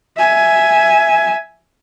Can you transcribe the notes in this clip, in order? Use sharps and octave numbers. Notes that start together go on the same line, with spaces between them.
E5 G#5